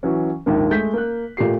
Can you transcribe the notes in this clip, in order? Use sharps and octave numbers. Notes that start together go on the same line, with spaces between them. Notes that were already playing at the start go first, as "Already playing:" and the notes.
E3 F#3 C#4
A#1 D#2 G#2 A#3
G#3 A3 G6 B6
A#3 F#6
A#2 A3 G4 C7